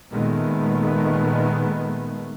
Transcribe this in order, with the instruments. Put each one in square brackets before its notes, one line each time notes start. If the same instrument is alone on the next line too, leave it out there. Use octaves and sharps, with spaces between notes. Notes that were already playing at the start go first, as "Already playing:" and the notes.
[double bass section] A#2 D#3 G#3 A3 B3